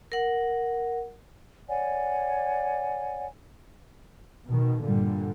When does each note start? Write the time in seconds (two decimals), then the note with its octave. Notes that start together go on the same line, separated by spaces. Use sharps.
0.12 A#4 F#5
1.68 C#5 D5 F#5 G#5
4.49 B2 D#3
4.84 G2 A#2 D3 G3